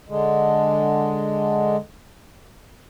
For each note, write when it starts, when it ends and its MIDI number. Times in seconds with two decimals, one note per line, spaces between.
0.09 1.76 50
0.09 1.76 56